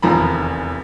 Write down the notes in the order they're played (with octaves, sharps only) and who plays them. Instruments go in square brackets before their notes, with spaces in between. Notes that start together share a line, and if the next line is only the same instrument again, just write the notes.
[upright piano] F1 E2 D#3 F3 A#5 B5